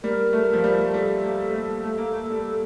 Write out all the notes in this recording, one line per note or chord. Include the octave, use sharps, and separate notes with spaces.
G3 A#4
A3
F3
G3
G3 A4
A#3
A3
G3
A3
A#3
A3
G3